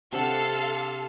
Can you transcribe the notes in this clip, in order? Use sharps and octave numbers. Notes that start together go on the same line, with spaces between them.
C3 D4 A4 F5 F#5